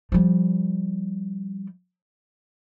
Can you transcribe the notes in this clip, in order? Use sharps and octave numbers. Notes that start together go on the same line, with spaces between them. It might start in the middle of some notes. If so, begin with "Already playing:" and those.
F3 G3